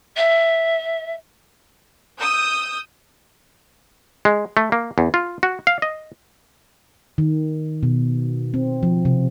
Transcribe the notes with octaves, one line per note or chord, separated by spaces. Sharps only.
E5
D#6 E6 G6
G#3
A3
A#3
E2
F4
F#4
F5
D#5
D#3
B2
C4
F3
C3